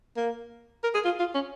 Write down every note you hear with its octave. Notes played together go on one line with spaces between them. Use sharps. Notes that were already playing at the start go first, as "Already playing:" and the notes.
A#3
A#4
G#4
F4
F4
C#4